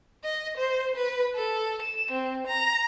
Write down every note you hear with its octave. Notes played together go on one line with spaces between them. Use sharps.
D#5
C5
B4
A4
E7
C4
A#5